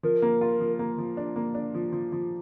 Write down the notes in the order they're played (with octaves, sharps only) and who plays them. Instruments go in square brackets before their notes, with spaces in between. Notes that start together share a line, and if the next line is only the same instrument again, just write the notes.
[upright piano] F3 [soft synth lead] A#4
[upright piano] A#3
F4
F3
A#3
F3
D4
A#3
D4
F3
F3
F3